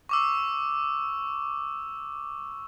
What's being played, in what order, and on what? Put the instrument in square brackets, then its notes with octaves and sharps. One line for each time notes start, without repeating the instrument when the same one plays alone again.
[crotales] C#6 D6 E6